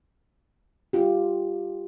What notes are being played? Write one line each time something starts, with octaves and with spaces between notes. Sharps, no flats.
F4 G4